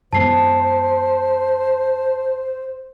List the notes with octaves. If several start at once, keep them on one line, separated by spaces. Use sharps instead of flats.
F#2 G#3 B3 C5 A5 C7